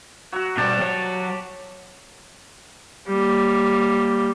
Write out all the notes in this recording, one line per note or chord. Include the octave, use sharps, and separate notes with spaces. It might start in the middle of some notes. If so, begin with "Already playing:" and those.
F#3 F#4
B2 G3 G4 A5
F#3 C#5
G3 A#3